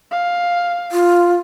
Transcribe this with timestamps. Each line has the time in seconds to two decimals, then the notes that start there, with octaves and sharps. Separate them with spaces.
0.11 F5
0.92 F4